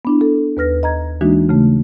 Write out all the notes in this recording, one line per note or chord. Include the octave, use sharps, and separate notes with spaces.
B3 D4 E4
A4
D#2 B4 F6 A#6
D#5 A#5 G#6
E3 G#3 A#3 D4 D#4 F#4
C#3 A3